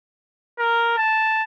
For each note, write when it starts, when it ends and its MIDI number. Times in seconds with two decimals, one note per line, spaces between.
0.59 0.93 70
0.98 1.43 81